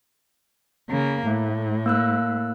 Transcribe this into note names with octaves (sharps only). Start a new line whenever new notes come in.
C#3 A#3
A2 A3
A#3 E6 F#6